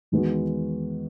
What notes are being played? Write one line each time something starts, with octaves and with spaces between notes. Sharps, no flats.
E2 D#3 G#3 B3 F#4